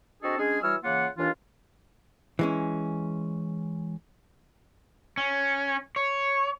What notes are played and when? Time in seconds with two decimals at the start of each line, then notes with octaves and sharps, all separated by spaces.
0.22 C4 D4 F#4 G#4 A4 D#5
0.38 G#3 C#4 D4 G#4
0.62 E3 G3 F#4 C#5 E6 F6
0.83 C#3 E3 A#3 F4 F#5
1.17 D#2 E3 D4 F4
2.39 E3 G#3 C#4
5.17 C#4
5.96 C#5